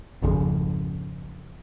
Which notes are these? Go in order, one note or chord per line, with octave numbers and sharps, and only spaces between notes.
G#1 F2 C#3